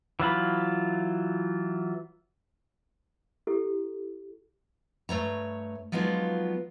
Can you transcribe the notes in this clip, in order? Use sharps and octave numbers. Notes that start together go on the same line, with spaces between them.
E3 F#3 F4 B5
E4 G4 A4
G2 A3 C#5 A#5
F3 F#3 G#3 B3 D#4 F4